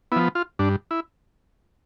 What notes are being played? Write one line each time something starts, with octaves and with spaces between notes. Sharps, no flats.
F3 B3 E4
F4
G2 D4
E4